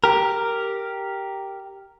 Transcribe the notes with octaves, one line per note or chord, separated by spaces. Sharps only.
G4 A#4